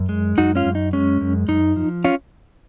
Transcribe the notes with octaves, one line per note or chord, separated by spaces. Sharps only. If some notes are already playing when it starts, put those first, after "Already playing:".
Already playing: F#2
G#3
F#2 D#4 F#4
C#4 F4
F#2
D#4
G#3 C#4
F#2
F#2 D#4
F3
C#4 F4